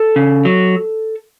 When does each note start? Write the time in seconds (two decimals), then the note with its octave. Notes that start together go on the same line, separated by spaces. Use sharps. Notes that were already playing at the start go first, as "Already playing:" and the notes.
Already playing: A4 A5
0.16 C#3
0.45 F#3